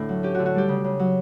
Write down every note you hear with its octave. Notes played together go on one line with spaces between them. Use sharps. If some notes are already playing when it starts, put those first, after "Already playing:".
Already playing: A2 D3 D4
F#3
C#4 G4
D3 F#4
F#4
G3 G4
C#3
C#3
F#3